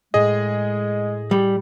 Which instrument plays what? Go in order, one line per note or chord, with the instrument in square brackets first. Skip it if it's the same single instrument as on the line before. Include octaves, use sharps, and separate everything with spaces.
[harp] A2 [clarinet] G#3 [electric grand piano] G#4 D#5
[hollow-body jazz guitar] G3 [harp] C#7